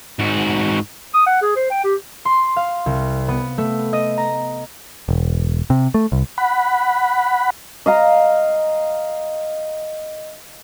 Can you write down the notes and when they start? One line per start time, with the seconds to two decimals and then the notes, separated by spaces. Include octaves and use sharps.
0.19 G#2 F#4
1.14 D#6
1.27 F#5
1.42 G#4
1.56 C5
1.71 G5
1.84 G4
2.25 C6
2.56 F5
2.86 C2
3.28 B3
3.58 A3
3.93 D#5
4.17 A#5
5.09 E1
5.70 C3
5.94 A3
6.12 C2
6.38 F#5 B5
7.86 D#5 F5 A#5